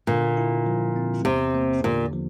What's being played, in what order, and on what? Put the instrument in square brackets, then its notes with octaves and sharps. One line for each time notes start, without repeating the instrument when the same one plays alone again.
[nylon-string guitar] A#2 [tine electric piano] D3
[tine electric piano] E4
F3
C4
[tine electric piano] E2 [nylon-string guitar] C3
[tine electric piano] A#3
[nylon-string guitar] A#2 [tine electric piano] D3
[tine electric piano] F3